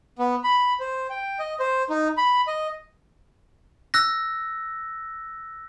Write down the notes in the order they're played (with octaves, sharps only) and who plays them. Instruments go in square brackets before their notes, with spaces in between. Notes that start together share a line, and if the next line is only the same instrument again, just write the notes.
[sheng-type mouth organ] B3
B5
C5
G5
D#5
C5
D#4
B5
D#5
[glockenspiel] E6 F#6 A#6